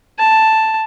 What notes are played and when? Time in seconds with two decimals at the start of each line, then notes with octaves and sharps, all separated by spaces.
0.19 A5